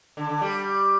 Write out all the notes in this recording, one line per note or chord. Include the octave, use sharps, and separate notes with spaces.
D3
D3
G3